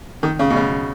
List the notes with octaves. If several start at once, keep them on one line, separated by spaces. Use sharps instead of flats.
D#3
C#3
B2
C#3